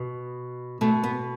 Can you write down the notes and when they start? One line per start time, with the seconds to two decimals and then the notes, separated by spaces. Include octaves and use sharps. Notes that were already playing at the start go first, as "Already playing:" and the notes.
Already playing: B2
0.81 B2 A3
1.03 B3